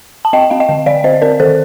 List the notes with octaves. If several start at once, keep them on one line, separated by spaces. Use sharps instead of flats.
A5
C4 D#5 G5
C4 F5
D#5 G5
D3
D3 D5 F5
C4 C5 D#5
C4 A#4 D5
D#3 A4 C5